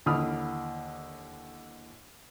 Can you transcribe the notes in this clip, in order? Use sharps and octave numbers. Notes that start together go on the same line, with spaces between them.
D#2 D3 E3 B5 D#6 F6